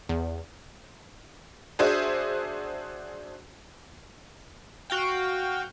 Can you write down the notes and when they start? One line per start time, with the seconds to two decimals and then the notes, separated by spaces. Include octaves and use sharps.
0.09 E2
1.79 D4 F#4 G#4 C5 E5
4.90 F#4 F5 G5